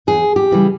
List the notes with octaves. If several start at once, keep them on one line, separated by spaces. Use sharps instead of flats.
E2 G#4
G4
C#3 E3 G3